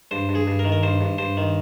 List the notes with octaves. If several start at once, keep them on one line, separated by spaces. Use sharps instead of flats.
G2 C5
G2
G#4
G2
A#4
D#3
A#4
G2 C5
G2
G2 C5
D#3